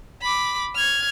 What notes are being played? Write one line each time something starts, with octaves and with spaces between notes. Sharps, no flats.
B5 D6
F6 G#6